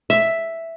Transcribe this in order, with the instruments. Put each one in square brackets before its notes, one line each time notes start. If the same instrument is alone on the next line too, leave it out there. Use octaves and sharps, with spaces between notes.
[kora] E5